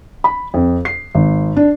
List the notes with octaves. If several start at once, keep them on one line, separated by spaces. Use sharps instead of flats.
B5
F2
C7
G#1
D4